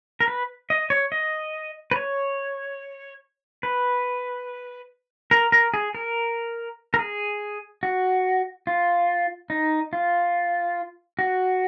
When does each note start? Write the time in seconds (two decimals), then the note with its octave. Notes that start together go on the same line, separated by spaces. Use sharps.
0.20 A#4
0.28 B4
0.70 D#5
0.90 C#5
1.12 D#5
1.91 B4
1.96 C#5
3.63 B4
5.31 A#4
5.52 A#4
5.74 G#4
5.95 A#4
6.94 A#4
6.99 G#4
7.83 F#4
8.67 F4
9.50 D#4
9.93 F4
11.19 F#4